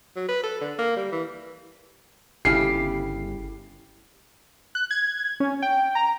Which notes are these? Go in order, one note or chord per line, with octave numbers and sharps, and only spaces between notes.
F#3
B4
A4
D3
A#3
G3
E3
G1 C#3 C#4 E4 G4 A4 C7
F#6
G#6
C#4
G5
A#5